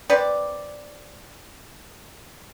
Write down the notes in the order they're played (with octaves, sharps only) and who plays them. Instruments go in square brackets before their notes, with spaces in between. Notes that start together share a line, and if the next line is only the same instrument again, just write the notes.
[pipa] C4 B4 D5